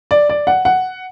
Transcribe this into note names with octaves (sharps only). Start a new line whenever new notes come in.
D5
D5
F#5
F#5